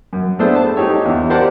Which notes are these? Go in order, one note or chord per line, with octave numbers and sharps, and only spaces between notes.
F#2
A3 B3 D4 G#4 A4 C5
A5
D#4 G4 C#5 E6
E2
G4 A#4 C5 D5 F#5 A5